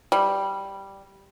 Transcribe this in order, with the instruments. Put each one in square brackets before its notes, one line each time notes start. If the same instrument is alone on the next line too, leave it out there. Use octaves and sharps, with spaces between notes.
[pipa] G3